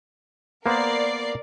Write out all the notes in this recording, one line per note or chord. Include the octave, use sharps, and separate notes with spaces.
A#3 B3 A#4 C5 D5 C7